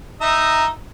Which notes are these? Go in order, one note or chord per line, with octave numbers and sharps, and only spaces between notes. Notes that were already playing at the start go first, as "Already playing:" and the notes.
D#4 E5 A#5